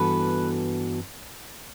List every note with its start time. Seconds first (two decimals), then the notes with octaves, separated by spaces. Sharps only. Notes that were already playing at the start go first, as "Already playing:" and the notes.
Already playing: G2 E3 B3 F#4 A4 B4